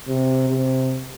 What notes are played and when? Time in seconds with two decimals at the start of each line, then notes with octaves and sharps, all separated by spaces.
0.08 C3
0.49 C3